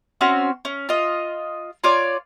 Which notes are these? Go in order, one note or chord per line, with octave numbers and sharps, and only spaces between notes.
C4 C#4 F#4
C#4
F4 D#5
F4 C#5 D5